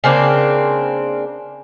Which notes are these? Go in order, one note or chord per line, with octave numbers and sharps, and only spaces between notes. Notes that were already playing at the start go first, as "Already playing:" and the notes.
C#3 A#3 C4 D4